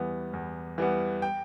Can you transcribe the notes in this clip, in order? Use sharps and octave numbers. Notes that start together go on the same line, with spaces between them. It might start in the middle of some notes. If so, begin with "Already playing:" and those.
Already playing: E2 E3 G3 B3
E2
E3 G3 B3
G5